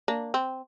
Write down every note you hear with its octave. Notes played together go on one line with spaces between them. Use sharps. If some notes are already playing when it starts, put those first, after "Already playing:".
A#3 D4
C4